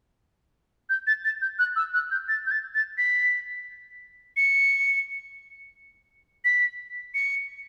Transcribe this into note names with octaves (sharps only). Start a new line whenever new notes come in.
G6
A6
A6
G6
F#6
E6
F#6
G6
A6
G6
A6
A6
B6
C#7
B6
C#7